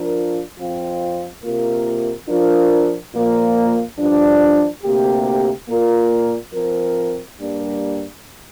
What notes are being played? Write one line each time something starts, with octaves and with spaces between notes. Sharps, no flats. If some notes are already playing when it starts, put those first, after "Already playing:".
Already playing: F3 D4 F4 A#4
F2 F3 C4 F4
C3 A#3 F4 A#4
F3 D4 F4 A#4
A#2 F3 A#3
G2 F3 D4
D2 C3 A#3 G4
A#2 A#3 F4 A#4
F3 C4 A#4
G2 G3 A#3 D4